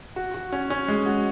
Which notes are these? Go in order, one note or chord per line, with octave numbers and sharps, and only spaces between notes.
F#4
F#4
C#4
C#4
G#3
F#4